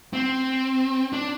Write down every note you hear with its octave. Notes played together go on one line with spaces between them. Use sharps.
C4
D4